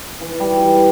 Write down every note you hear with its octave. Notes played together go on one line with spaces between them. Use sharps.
E3
G3
E3